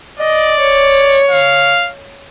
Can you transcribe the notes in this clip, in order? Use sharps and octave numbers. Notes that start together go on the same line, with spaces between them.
D5 D#5
C#5
F5